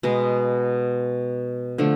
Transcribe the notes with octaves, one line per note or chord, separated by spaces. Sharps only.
B2 G#3 B3
D3 F3 A3